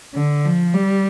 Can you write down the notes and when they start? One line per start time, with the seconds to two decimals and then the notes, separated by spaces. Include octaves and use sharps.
0.15 D3
0.45 F3
0.74 G3